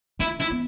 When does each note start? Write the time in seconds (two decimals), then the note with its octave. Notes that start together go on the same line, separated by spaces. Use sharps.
0.20 A3 E4
0.40 E4
0.50 B3